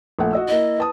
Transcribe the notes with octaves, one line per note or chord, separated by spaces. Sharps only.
A#1 A3 F#5
F#4 D#5 E6
A#3 E4 D#5
B4 A5 D#6